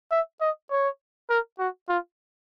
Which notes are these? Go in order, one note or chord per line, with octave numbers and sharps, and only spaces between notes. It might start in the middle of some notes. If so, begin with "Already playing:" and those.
E5
D#5
C#5
A#4
F#4
F4